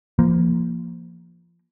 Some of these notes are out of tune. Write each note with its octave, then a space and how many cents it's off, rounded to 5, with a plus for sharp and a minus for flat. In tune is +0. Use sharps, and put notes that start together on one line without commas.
F3 -25 A#3 +0